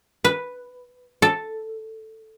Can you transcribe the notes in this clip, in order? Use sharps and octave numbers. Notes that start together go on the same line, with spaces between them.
B4
A4